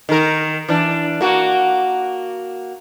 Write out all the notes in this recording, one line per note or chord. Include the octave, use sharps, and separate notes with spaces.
D#3 A#4
E3 D4
A#3 F#4